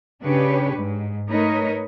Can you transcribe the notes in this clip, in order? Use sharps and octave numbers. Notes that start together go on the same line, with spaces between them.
C#3 D4 G4 B4 C#5
G#2
A3 D#4 A#4 B4 C#5 D#5